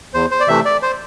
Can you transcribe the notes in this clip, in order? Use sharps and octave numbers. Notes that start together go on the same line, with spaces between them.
E2 C5
C5
D5
C3 E3 A3 E5
D5
C5